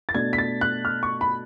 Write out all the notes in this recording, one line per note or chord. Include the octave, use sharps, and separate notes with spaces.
A6
B2 A3 D4 G#6
B6
A6
F#6
F6
C#6
B5